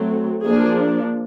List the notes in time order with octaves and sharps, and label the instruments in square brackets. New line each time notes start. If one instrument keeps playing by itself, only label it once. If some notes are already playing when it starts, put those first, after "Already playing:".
Already playing: [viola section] F#3 A3 C4
F3 A#3 D4 G#4